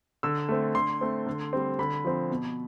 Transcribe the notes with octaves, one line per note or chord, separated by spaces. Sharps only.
D3 E6
A3 C4
D3 C6
A3 C4
D3
G3 C4
D3 B5
F3 C4
B2